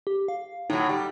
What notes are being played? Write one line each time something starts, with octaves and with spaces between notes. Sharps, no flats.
G4
F5
A2 F#3 D#4
G3